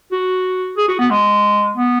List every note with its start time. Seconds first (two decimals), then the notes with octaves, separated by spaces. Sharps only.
0.12 F#4
0.77 G#4
0.88 F#4
0.99 B3
1.10 G#3
1.76 B3